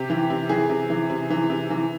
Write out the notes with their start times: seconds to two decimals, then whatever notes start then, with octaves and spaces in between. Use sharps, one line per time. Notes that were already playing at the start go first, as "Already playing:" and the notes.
Already playing: C3 G4
0.10 E3
0.30 C3
0.49 E3 G#4
0.70 C3
0.90 E3
1.10 C3
1.30 E3
1.50 C3
1.70 E3